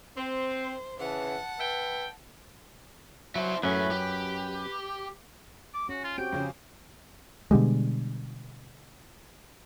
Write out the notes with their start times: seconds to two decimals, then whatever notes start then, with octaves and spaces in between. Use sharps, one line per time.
0.16 C4 C5
0.99 C#3 E3 F#5 A5
1.60 B4 E5 G5
3.35 F#3 E4 C5
3.63 F#2 A2 C#4 B4
3.91 G4
5.74 D6
5.89 C#4 F#4
6.04 F4
6.18 C4 F#4 G4 G5 D7
6.33 F2 C#3 C#4
7.51 B2 D3 G3 G#3